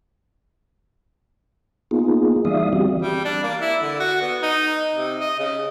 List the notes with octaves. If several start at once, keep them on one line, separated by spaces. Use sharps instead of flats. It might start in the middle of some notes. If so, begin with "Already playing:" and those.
A#3 B3 D#4 F4 G#4
E3 G3 D5 E5 F5 D#6
E3 C4 F#4 G4
G3
D4
A#3
E4
D3
F#4
B3
D#4
C3
D#5
C#3